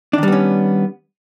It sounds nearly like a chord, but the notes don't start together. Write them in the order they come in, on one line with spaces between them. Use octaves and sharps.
D4 D#3 G3 B3 C#4